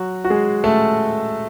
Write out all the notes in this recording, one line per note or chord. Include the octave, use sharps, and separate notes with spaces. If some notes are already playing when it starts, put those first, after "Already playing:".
Already playing: F#3 F#4
F#4
G#3 G#4
A3 A4